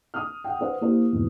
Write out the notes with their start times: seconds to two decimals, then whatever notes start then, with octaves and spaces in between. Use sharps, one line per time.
0.14 D#6 F6
0.44 F#5 G5
0.59 B4 C5 F#5
0.81 A#3 E4 G4 C5
1.13 E2 G#2 B2